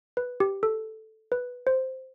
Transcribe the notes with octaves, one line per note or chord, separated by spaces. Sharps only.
B4
G4
A4
B4
C5